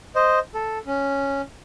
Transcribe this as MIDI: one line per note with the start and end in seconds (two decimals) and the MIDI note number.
0.15 0.39 72
0.15 0.39 75
0.55 0.78 69
0.87 1.41 61